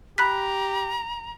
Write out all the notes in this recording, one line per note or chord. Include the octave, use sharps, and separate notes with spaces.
G4 A#5 B5 F#6 B6